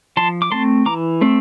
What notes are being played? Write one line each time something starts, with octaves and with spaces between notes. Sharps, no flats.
F3 A5 C6
D6
A3 C4 A5 C6
E3 A#5 D6
A3 C4